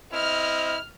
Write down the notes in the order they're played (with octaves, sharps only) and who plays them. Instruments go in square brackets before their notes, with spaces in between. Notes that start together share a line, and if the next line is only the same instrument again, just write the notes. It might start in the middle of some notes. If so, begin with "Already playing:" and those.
[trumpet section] C4 E4 D#5 [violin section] F6